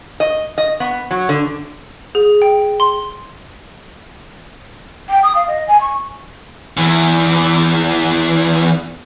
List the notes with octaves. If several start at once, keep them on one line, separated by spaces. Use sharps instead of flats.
D#5
D#5
B3
F#3
D3
G#4
G5
C6
G5
D#6
F5
D#5
G#5
C#6
E2 E3